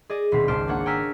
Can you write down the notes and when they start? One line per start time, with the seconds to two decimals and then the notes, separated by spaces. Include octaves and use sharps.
0.10 G#4 D5 D#5
0.32 D#1 B2 C4 B6
0.48 G#1 C#2 C5 A5 F6 D7
0.68 A#3 D4 C#5 F#5
0.86 G5 G#5 A#5 E6 F6 B6